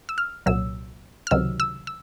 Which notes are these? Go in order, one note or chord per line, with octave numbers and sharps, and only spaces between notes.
E6
F6
C2 A#2 F#3 E6
F6
C#2 C3 D#3 F#3 E6
E6
E6